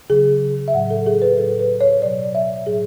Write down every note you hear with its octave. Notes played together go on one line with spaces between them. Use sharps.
C#3 F#3 G#4
E5
A2 F#3 F#5
A4
G#4
B4
A2 F#3 A4
B4
C#5
B2 F#3 D5
E5
A2 F#3 G#4